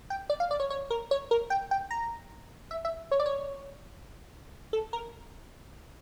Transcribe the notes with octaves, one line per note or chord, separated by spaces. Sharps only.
G5
D5
F5
D5
C#5
C#5
A#4
C#5
A#4
G5
G5
A#5
E5
E5
C#5
D5
C#5
A4
A#4